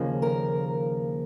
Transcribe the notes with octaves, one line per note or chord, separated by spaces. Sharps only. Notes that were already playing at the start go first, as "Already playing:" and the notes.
Already playing: D#2 C#3 F3 A#3
A#4